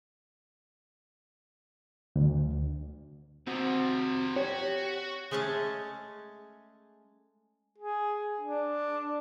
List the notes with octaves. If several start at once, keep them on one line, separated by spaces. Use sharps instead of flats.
D2
C3 F3 C4 F#4
F#4 G4 C#5
G#3 A3 C#4 G#4 A5
G#4
D4